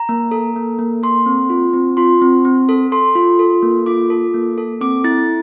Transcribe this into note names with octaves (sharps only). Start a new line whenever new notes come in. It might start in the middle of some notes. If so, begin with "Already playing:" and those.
Already playing: A#5
A#3
A4
A#3
A#3
A4 C6
C4
F4
C4
F4 C6
C4
C4
A4
A4 C6
F4
A4
A#3
F4 D6
A4
A#3
A4
C4 D6
E4 A6